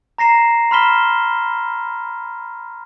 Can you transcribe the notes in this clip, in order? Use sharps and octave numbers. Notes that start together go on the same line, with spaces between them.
A#5 A#6 C7 E7
B5 C6 F6 B6 E7 G7